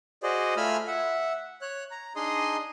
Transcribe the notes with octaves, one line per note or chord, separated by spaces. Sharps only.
F#4 G#4 C5 D5 D#5
A3 F4 G#5 B5 E6 F6
E5 F#5
C#5 F#6
A#5
D4 D#4 G#4 D#5 C6 D#6